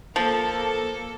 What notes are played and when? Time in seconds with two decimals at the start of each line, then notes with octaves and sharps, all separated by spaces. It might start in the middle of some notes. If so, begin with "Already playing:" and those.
0.16 F3 A#3 A4